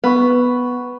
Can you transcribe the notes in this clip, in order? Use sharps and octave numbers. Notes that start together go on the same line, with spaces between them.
B3 B4 B5 C#6